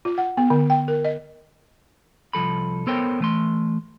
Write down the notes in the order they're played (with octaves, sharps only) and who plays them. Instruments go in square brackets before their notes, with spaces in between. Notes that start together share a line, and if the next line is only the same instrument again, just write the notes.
[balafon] F4
F#5
B3
D3
G5
A#4
D#5
[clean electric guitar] C2 F3 A4 B5
B3 A4 A#4 C5 C#5 G5
E3 A3 C6